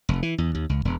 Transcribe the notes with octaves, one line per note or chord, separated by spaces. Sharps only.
F1
E3
E2
D#2
C#2
E1